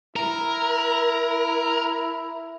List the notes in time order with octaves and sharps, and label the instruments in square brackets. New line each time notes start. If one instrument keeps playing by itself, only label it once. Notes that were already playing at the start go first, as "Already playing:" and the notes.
[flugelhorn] E4 [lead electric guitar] A#4